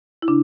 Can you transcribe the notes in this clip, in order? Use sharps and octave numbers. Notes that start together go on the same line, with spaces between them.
E4
C#3 D4